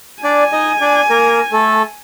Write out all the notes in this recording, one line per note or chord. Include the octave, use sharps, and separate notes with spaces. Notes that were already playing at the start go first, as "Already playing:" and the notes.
D4 D5 G#5
D#4 D#5
D4 D5
A#3 A#4
A3 A4